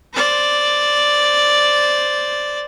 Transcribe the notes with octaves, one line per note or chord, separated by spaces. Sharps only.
C5 D5